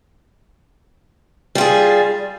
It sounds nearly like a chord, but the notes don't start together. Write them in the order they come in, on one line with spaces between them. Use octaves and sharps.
G3 F4 G#4